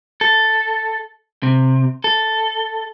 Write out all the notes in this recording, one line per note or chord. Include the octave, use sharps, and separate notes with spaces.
A4
C3
A4